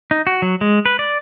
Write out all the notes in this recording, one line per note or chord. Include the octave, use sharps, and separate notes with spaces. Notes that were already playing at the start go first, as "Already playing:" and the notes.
D#4
F#4
F#3
G#3
B4
D5